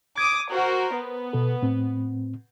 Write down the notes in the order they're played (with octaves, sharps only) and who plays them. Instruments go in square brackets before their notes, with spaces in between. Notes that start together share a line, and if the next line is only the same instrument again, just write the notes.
[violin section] D6 D#6 [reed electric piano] G#6
[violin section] F#4 A#4 C5
B3
[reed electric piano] B2 A4
A2 C4